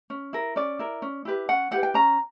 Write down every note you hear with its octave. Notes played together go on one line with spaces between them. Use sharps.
C#4
E4 A#4
C#4 D5
E4 A#4
C#4
E4 G4 B4
C#4 F#5
E4 G4 B4 F#5
G5
C#4 A#5